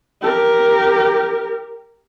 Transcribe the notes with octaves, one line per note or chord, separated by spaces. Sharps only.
G4 A#4